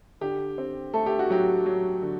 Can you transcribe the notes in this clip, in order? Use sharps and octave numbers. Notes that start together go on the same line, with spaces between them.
D3 G4
C4
A3 A4
G4
F#4
F#3 G4
F#3
D3